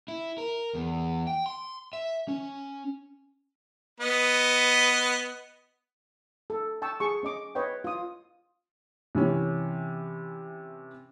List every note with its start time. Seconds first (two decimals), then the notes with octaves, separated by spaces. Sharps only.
0.08 E4
0.38 A#4
0.75 E2
1.27 G5
1.46 C6
1.93 E5
2.28 C#4
4.00 B3 B4 D#5
6.50 A4
6.82 G5 A5 C#6 E6
7.00 G#4 C#6
7.23 C#4 D#5 D6
7.55 B4 C#5 D#5 G5
7.84 F4 D#6
9.15 C3 E3 C#4